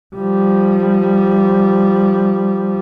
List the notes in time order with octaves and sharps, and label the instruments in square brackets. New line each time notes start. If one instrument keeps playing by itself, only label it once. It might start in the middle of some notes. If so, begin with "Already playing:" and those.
[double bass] F3 G3